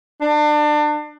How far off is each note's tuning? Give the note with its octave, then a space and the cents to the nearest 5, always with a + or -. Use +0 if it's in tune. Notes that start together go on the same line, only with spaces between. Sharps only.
D4 +30